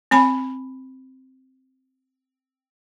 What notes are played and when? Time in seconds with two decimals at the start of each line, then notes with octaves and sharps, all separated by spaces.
0.11 C4 G#5 B5